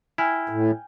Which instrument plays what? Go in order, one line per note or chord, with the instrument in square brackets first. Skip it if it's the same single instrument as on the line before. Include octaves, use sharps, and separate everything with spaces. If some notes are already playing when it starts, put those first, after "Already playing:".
[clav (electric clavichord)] E4 [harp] G5 G#5 F6
[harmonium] A2